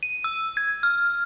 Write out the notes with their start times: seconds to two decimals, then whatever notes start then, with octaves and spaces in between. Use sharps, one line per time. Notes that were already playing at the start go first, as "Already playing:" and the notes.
0.03 D#7
0.24 E6
0.57 G#6
0.83 F6